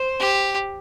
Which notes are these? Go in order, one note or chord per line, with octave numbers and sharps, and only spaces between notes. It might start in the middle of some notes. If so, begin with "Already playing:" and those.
Already playing: C5
G4